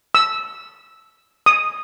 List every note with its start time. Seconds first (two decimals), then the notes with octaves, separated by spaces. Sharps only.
0.15 E6
1.46 D#6